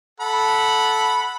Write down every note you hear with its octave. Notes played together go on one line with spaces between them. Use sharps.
A4 F#5 B5